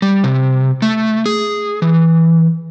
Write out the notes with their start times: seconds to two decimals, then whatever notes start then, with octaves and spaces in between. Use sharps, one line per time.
0.02 G3
0.24 C3
0.82 A3
1.26 G#4
1.82 E3